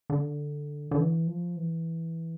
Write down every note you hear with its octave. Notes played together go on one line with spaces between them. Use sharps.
D3
D3
E3
F3
E3